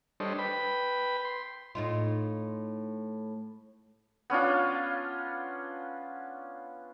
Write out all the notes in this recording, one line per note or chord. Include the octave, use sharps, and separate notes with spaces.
G3 D4 A4 C5 C#5 D#5
B4 G5 B5
C6
A2 D#4 F4
B3 C#4 D4 F4